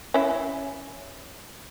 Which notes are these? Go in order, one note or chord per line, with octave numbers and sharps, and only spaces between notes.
C#4 E4